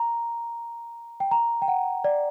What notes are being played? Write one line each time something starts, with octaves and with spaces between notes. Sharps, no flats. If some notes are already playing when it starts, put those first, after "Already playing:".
Already playing: A#5
G5
A#5
G5
F#5
D5